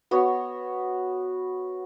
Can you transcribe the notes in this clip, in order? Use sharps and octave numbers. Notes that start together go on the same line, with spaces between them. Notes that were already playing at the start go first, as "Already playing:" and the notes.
B3 F#4 C#5